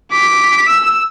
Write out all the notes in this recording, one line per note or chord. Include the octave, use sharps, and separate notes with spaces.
D6 B6
E6